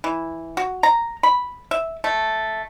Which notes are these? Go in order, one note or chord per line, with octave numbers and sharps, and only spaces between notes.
E3
F#4
A#5
B5
E5
A3